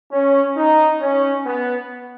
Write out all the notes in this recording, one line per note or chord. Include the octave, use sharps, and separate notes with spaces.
C#4
D#4
C#4
B3